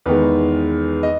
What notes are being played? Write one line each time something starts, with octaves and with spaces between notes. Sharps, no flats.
E2 D#3 G#3 B4
D#5